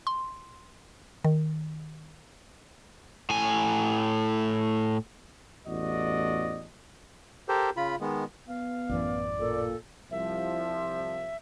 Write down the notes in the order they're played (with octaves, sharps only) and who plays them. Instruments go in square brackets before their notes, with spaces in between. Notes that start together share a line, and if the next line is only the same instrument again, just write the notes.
[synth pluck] C6
D#3
[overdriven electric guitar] A2 G#5
[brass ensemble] A1 E2 A2 F#4 D5 D#5
[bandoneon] G4 A4 A#4 C5
C#3 F4 B5
D#3 G#3 B3
[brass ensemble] B3 [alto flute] F5
[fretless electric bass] A1 F#2 E3 [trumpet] D5
[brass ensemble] A#2 [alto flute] A4
[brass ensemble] C2 F3 [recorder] E5